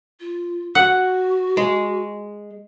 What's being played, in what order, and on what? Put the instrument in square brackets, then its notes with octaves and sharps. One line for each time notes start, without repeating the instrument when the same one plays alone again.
[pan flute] F4
[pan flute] F#4 [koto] F#5
[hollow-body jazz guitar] G#3